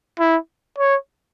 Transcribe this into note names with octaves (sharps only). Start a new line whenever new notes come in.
E4
C#5